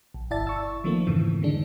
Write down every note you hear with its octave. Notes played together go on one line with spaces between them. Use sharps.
A#1
G1 E4 D5 E5 A5 A6
C#6 E6
D#3 F3 A3 A#3 C4
F2 G#2 C#3 E3
D3 D#3 G#3 D4